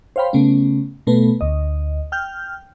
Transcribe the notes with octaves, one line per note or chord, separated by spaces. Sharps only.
C5 C#5 F5 G5 B5 C6
C#3 A3 B3 C#4
B2 A3 B3 B4
D2 D#5
G5 F6 G6